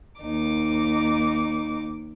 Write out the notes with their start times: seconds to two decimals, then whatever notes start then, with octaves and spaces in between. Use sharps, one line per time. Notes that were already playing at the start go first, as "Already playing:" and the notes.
0.22 D#2 D#4 D6